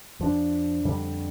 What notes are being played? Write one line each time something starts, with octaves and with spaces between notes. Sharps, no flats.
F2 F3 D4
F2 D3 G3